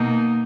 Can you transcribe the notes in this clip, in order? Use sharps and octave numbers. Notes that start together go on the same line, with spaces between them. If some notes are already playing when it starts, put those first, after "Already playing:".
Already playing: B2 A#3 D#4